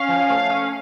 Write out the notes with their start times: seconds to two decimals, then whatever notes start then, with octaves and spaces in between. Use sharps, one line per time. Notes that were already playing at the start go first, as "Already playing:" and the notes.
Already playing: C#4 F5
0.09 F3
0.30 A3
0.50 C#4